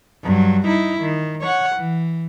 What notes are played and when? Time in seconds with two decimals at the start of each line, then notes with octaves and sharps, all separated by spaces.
0.24 G2 F#3
0.67 D#4 E4
1.00 D#3
1.41 C#5 F#5
1.75 E3